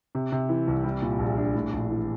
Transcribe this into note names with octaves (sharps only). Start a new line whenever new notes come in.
C3
C3
E3
C2
G3
A#2
A#1
D4
A2
A#1
E3